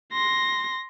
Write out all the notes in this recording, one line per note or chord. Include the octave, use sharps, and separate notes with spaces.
C6 A#6